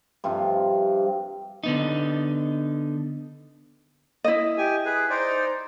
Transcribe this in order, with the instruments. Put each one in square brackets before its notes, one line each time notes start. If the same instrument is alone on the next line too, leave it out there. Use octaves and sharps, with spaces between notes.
[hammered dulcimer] G2 C3 F3 F4
[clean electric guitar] D3 B3 D#4
[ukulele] E4 D#5
[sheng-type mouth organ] G4 G#5
G#4 B4
D#4 C5 D5